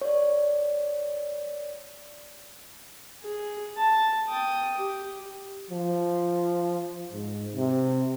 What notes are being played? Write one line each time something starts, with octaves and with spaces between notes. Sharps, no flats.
C#5 D5
G#4
A5
G5 D#6
G4
F3
G#2
C3